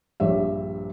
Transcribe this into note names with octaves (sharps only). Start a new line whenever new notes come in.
A#1 G2 G3 G4 C#5 E5